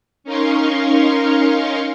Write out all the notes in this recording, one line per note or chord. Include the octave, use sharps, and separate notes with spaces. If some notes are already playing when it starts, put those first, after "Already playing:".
C#4 D#4 A#4 F5 C6 C#6